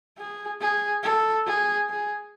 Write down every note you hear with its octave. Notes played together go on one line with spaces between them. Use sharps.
G#4
G#4
A4
G#4
G#4